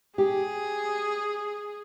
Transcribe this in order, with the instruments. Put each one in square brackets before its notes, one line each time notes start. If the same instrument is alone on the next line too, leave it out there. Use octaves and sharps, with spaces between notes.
[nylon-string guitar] G4 [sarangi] G#4